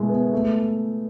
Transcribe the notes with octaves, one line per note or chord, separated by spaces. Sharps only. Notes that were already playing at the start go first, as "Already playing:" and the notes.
Already playing: B2 G#3 E4
B3
A3